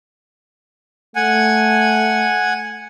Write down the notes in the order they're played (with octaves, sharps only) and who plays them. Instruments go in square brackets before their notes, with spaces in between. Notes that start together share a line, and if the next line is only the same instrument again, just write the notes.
[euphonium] A3 [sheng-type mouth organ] F#5 G#5